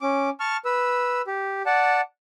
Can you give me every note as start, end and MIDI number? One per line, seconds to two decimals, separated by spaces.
0.01 0.30 61
0.01 0.30 86
0.40 0.57 81
0.40 0.57 85
0.40 0.57 89
0.65 1.22 71
0.65 1.22 88
1.27 1.62 67
1.66 2.01 74
1.66 2.01 78
1.66 2.01 81